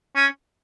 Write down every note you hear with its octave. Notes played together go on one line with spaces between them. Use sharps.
C#4